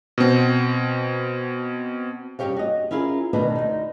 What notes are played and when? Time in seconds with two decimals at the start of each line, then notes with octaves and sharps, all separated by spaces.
0.18 B2 C4
2.39 G2 C#3 A3 G4 C#5 F5
2.57 F#4 D#5
2.91 C#4 E4 F4 G#4 A#4
3.33 D2 B2 D#3 D4 B4
3.55 D2 D#4